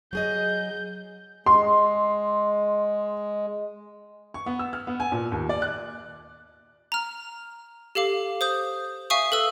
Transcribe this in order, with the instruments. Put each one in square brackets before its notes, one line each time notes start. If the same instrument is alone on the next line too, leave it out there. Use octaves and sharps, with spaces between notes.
[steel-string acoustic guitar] F#3 G#4 D#5 [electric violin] G6
[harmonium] G#3 [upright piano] C6
[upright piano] C#6
B3
E6
F6
B3
G#5
A#2
D#2
D5
F#6
[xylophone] A#5 F6
G4 A4 F5 D6
C5 D#6 G6
E5 F5 G#5 C#6 D#6
A4 B4 E6